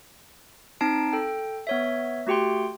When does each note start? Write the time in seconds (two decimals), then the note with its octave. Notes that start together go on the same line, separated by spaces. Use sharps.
0.81 C4 D#4 A5 C7 D7
1.13 A4 G5
1.67 B3 C#5 E5
2.27 A3 F#4 G4 G5 C6